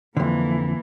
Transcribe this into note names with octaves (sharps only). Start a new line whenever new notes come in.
F2 D3 E3 A#3